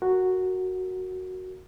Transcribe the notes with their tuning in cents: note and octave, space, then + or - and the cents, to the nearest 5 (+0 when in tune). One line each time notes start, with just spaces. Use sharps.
F#4 +0 A#4 -15